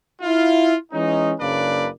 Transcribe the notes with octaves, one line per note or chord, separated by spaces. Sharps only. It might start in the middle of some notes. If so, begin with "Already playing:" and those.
E4 F4
E3 G#3 C#4 D#4
F#1 C#3 A#3 D4 B4 D5